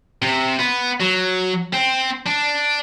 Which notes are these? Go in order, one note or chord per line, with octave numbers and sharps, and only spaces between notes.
C3
B3
F#3
C4
D4